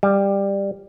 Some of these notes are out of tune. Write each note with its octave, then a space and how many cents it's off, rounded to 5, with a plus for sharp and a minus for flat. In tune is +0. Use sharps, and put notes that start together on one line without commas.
G3 +15